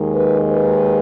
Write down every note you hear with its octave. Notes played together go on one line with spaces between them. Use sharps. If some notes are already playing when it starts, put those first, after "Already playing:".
Already playing: D#2 D#3 G#3
B4
B4